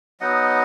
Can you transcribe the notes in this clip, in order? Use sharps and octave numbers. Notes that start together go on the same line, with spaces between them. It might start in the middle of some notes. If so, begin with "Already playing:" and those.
F#3 B3 D#4 D#5 F#5